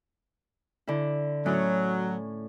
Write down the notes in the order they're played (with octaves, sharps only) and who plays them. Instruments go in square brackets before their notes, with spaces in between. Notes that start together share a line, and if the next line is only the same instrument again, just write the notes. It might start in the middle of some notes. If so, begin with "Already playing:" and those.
[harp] D3 E4
[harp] A2 C#4 [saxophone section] F#3